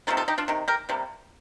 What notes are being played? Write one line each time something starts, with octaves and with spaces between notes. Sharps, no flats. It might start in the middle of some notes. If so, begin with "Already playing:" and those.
C3 D#3 A#3 F4 A4
F4 A4
D#4 G4
D4 F4
C3 D#3
G4 A#4
C3 G3 A#3